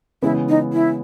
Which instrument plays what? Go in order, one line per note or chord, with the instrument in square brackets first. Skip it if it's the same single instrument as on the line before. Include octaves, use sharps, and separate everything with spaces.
[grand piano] C#3 E3 G#3 B3 [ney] E4
[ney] D#4
E4